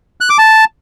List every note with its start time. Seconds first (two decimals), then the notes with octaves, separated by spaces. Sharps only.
0.21 F#6
0.30 D6
0.38 A5